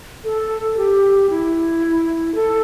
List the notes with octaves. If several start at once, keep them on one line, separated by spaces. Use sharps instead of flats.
A4
G4
E4
A4